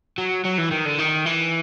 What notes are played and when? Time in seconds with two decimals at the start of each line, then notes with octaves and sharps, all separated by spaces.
0.18 F#3
0.45 F#3
0.58 E3
0.72 D#3
0.86 D3
0.99 D#3
1.26 E3